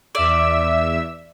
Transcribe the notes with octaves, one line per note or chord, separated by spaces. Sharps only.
E2 D5 E5 E6